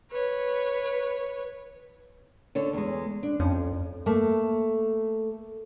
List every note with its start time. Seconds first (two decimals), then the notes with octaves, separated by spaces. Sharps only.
0.11 B4 C#5
2.55 D3 A4 C#5
2.73 E2 G#3
3.23 D4
3.40 F2 C#4
4.06 A3 A#3